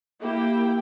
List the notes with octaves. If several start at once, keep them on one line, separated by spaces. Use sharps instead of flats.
A#3 E4 G4 G5